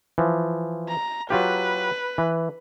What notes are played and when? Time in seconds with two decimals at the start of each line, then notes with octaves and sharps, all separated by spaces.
0.18 E3 F3
0.88 A#5
1.30 F#3 F4 G4 B4
2.18 E3